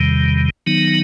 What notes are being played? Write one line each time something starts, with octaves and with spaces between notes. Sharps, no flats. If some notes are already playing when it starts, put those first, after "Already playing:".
Already playing: E2 C3 D#3 G3
D#3 F#3 B3 D#4